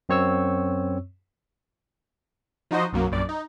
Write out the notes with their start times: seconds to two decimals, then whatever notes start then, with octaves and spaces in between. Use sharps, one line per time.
0.09 F#2 C4 C#5 C#6 E6
2.71 F3 D#4 F#4 C5 D#5
2.92 B1 F#2 F#3 A#3
3.12 A#1 F#2 D5
3.29 D#4